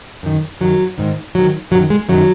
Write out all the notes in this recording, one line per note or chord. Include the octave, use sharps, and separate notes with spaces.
F#2 D#3
F#2 D#3 F#3
G#2 D#3
G#2 D#3 F#3
F#2 D#3 F#3
G#3
F#2 D#3 F#3